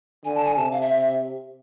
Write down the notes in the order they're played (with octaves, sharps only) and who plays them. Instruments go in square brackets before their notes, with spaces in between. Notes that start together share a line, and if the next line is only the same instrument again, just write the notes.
[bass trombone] D3 [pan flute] G#5
[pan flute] A5
G#5
[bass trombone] C3 [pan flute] A5
[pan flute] F5
E5